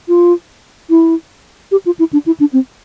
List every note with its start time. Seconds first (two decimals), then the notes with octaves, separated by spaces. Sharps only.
0.08 F4
0.90 E4
1.71 G4
1.86 F4
1.99 E4
2.13 D4
2.26 E4
2.40 D4
2.53 C4